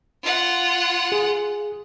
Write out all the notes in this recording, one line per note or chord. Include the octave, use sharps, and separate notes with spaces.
F4 F#5
G#4